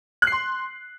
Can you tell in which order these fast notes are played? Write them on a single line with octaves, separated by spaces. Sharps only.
F#6 C7 C6